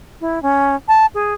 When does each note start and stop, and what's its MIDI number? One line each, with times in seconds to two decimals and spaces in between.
0.21 0.41 64
0.42 0.75 61
0.88 1.06 81
1.14 1.34 68